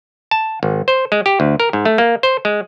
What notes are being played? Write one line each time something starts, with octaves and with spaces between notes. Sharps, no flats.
A5
G#1
C5
G#3
G4
D2
A#4
G#2
A3
A#3
C5
G#3